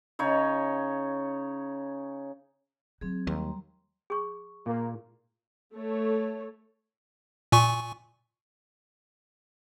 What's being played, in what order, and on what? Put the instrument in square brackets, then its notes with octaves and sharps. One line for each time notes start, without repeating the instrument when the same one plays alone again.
[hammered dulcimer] C#3 D#4 C#5
[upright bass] F#3 [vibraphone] C4 G#4
[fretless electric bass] D#2 [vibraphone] G3 A#5 C6
[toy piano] G#4 C#6
[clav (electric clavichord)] A#2 [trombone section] A#3
[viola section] A3 A4 C#5
[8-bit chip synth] A#2 G#5 C#6